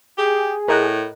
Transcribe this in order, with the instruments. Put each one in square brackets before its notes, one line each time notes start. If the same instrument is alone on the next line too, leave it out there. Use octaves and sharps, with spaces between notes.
[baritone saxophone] G4 [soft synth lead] G#4
[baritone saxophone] A2 [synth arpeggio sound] A#4 D#5 F#6